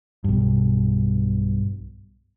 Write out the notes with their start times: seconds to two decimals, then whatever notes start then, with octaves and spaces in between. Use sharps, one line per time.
0.24 B1 G2